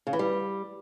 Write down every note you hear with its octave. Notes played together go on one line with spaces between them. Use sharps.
C#3
E3
G3